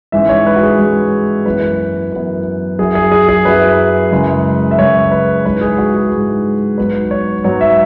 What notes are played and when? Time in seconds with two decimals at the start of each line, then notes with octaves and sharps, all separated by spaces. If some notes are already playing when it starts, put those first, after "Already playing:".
0.12 G#2 E3 G#3 C#4 E5
0.29 C#5
0.46 B4
0.56 F#4
0.63 G#4
0.79 G#2 E3 G#3 C#4
1.46 F#2 E3 B3 B4
2.12 F#2 E3 B3
2.79 F#2 F#3 E4 G#4
2.95 G#4
3.12 G#4
3.29 G#4
3.45 F#2 F#3 E4 B4
4.11 F#2 C#3 G#3 E4
4.71 E5
4.78 F#2 C#3 G#3 E4 C#5
5.11 B4
5.45 G#2 G#3 E4 B4
5.61 G#4
5.78 F#4
5.95 G#4
6.11 G#2 G#3 E4
6.78 G#2 F#3 B3 B4
7.11 C#5
7.44 G#2 F#3 B3 C#5
7.61 E5